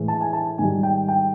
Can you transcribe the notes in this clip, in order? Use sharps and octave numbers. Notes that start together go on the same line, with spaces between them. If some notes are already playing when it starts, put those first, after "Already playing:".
Already playing: A2 E3 G#3
A5
G#5
A5
G#2 D#3 G3 G#5
G5
G5